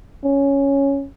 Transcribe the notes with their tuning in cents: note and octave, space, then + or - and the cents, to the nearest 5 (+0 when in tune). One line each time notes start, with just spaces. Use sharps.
C#4 +0